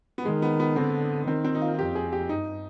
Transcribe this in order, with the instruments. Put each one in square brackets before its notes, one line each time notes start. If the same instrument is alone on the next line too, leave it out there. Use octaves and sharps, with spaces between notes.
[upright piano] B3
[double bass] D#3 [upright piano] G#3
[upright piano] B3
B3
[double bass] D3 [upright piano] C4
[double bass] D#3 [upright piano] C4
[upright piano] C4
D#4
F4
F4
[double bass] F2 [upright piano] G4
[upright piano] G#4
G4
[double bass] G2 [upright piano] D#4